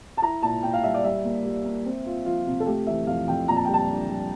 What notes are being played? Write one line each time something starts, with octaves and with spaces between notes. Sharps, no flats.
A5
E4 A#5
A#2 A5
A#2 G5
F5
G3 E5
D5
G3 E5
A#3
G3
A#3
C4
F4
F3 F4
C3
A4
A3 G4
E3 E5
F2 F5
F2 G5
A#2 A#5
A5
G5
G3
A5
D4
G3